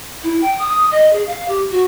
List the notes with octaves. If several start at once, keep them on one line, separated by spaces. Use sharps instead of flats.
E4
G5
D#6
D#5
G#4
F5
G4
F#4